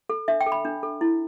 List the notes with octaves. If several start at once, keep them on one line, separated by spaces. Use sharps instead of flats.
A4
D4 E5
G5
A4
B5
D4
A4
E4